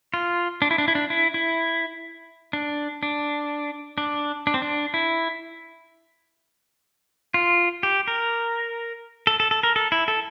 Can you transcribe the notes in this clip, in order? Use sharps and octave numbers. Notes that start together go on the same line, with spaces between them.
F4
D4
E4
D4
E4
D4
E4
E4
D4
D4
D4
D4
C4
D4
E4
F4
G4
A#4
A4
A4
A4
A#4
A4
E4
A4